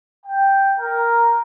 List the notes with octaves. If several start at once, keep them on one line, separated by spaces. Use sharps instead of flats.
G5
A#4